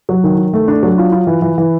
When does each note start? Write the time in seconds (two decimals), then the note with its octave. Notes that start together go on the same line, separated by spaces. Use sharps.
0.09 F#3
0.24 D#3
0.37 D#3
0.53 A3
0.68 D4
0.83 F#3
0.98 F4
1.12 F4
1.27 E3
1.42 E3
1.58 E3